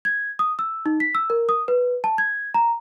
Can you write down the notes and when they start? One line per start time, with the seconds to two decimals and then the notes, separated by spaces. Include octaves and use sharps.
0.05 G#6
0.39 D#6
0.59 E6
0.86 D#4
1.00 B6
1.15 E6
1.30 A#4
1.49 D#6
1.68 B4
2.04 A5
2.18 G#6
2.54 A#5